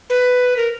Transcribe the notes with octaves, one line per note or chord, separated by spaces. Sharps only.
B4
A#4